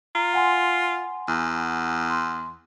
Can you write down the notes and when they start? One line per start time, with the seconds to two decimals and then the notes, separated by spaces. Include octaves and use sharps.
0.15 F4 A#5
0.33 F#5 G#5 C6
1.28 E2
2.10 C6